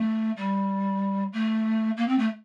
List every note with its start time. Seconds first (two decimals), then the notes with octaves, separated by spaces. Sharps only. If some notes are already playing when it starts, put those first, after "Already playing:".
Already playing: A3
0.37 G3
1.33 A3
1.97 A#3
2.08 C4
2.18 A3